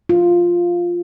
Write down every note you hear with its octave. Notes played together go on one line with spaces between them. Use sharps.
F4